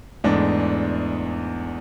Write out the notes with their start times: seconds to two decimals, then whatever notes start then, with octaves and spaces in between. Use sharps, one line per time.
0.24 E2 G#2 E3 G#3 A3 D4